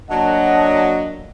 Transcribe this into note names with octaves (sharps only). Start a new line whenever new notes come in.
F#3 A#3 D4 D#5 F#5 A5